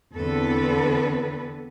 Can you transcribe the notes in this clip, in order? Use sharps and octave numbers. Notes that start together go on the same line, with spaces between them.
E2 D3 B3 C4 A4 B4